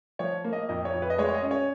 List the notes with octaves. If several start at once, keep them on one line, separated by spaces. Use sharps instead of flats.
F3 C#5
A#3
D#5
F2 D#5
C#5
F2
B4
D#5
G#3 C#5
C#5
D#5
C#4
C#5